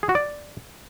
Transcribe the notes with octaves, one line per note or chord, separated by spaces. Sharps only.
G#4
F#4
D5